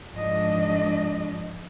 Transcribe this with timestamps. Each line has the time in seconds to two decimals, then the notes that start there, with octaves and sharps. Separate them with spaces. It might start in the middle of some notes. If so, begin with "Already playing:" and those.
0.14 G#2 F3 D4 D#5